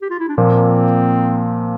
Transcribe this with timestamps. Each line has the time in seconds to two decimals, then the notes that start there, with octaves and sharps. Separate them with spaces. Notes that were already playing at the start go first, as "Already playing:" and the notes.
0.02 G4
0.10 F4
0.20 E4
0.28 D4
0.38 A#2 F3 A#3 C4